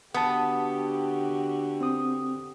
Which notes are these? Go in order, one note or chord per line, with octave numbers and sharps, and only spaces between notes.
D3 B3 F#4 G4 A5 D#6
C4 D#6